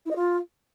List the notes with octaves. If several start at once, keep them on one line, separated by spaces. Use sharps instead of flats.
E4
D#5
F4